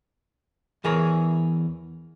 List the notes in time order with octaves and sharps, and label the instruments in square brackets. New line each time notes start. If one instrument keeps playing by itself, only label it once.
[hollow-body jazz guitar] E2 E3 G#4 A#4 C#5